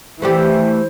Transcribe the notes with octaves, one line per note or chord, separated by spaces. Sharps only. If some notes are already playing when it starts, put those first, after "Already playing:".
E3 A3 D4 G4 C5